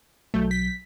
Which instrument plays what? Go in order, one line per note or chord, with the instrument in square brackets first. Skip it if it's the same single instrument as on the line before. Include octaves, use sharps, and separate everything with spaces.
[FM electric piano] B1 F#3 G6 [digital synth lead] A3
[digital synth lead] B6